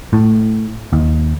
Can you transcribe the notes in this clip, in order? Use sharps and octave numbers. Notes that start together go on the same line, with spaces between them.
A2
D#2